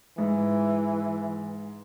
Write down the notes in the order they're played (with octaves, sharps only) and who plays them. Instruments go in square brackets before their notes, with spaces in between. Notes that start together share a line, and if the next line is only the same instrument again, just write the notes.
[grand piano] G#2 [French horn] E3